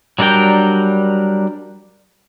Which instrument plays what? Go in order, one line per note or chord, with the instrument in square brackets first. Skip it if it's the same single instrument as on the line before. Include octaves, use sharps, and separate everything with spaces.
[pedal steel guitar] F#3 G3 D4 A#4 G5